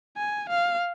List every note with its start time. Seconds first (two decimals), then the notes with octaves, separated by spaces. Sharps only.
0.17 G#5
0.49 F5